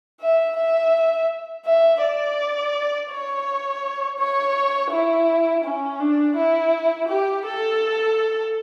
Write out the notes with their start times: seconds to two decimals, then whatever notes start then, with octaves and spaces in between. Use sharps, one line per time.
0.21 E5
0.57 E5
1.65 E5
2.02 D5
3.10 C#5
4.19 C#5
4.92 E4
5.64 C#4
6.00 D4
6.37 E4
7.09 G4
7.45 A4